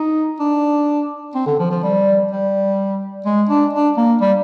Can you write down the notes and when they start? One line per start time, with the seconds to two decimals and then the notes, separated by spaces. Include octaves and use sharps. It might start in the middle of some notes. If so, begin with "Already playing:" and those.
Already playing: D#4
0.40 D4
1.35 C4
1.46 D3
1.59 F3
1.70 F3
1.83 G3
2.31 G3
3.25 G#3
3.49 D4
3.73 D4
3.97 A#3
4.21 G3